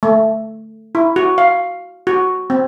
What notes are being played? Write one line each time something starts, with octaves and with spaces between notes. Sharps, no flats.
A3
E4
F#4
F5
F#4
C4